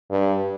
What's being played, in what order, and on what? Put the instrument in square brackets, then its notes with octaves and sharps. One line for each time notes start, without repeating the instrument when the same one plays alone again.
[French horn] G2